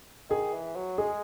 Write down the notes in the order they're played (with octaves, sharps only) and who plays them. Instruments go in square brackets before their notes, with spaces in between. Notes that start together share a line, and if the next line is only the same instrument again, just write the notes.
[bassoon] D#3 [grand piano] G#4
[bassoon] E3
F#3
[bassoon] G#3 [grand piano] G#4